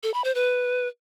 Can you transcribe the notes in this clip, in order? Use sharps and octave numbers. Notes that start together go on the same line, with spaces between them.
A4
B5
C5
B4